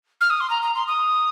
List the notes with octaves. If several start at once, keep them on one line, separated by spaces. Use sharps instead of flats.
F6
D#6
C6
A#5
A#5
C6
D#6